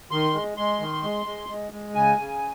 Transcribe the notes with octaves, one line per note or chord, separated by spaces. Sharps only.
D#3 C6
G#3
G#3 C6
D#3
G#3
G#3
G#3
G#3
C#3 G#5
C#3